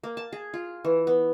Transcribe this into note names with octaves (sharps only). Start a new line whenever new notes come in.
A#3
A5
G#4
F4
E3
B3